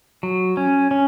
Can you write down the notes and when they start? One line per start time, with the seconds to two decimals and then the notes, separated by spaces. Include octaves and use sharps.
0.23 F#3
0.57 C#4
0.91 C#4